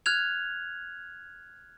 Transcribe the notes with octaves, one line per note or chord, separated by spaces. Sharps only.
F6 F#6 G#6 F7